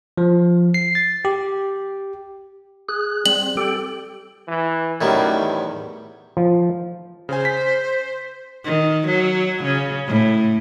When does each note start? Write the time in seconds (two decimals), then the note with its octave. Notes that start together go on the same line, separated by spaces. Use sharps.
0.18 F3
0.74 C7
0.95 A6
1.25 G4
2.89 G#4 F#6
3.26 G3 C4 F#7
3.57 G4 A4 G5
4.48 E3
5.01 F#2 A2 D#3 G3
5.38 E2
6.37 F3
7.29 C#3 C5 G#5
7.45 B6
8.64 D#3
9.07 F#3
9.64 C#3
10.07 A2